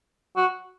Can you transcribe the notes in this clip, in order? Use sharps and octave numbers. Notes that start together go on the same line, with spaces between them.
F#4